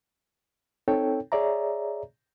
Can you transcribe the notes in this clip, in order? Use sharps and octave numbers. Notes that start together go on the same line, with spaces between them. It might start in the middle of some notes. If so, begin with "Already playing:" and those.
C4 D#4 A4 C#5 G5
G#4 C#5 D5 E5 A#5